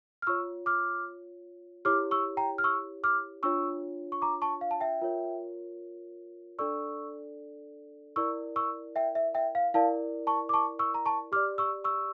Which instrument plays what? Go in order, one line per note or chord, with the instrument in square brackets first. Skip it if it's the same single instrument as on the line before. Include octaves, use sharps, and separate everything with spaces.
[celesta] F6
F4 C#5 C#6 E6
D6 F6
E4 G4 C#5 D6 F6
C#6 E6
G5 A#5
F6
C#6 E6
D6 F6
D4 F4 C#5 C#6 E6
C#6
A#5 D6
A5 C#6
F5
A5
E5 G5
F4 A#4 C#5
D4 A4 D5 C#6 E6
E4 A#4 D5 C#6 E6
C#6 E6
E5 G5
E5
E5 G5
F5
E4 A#4 D5 F5 A5
A5 C#6
D6
A5 C#6
C#6 E6
A#5
A5 C#6
G4 D6 F6
D5
C#6 E6
C#6 E6